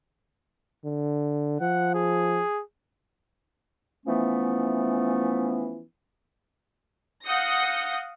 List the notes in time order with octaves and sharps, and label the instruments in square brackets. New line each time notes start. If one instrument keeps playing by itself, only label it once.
[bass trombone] D3
[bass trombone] F3 [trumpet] F#5
[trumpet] G#4
[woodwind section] E3 F3 A3 B3 C#4
[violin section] F5 F#5 D#6 G6 A#6 C#7